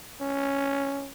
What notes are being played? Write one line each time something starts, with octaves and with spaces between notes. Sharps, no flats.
C#4